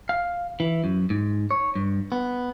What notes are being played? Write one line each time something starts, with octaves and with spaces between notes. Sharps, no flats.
F5
E3
F#2
G#2
C#5
G2
B3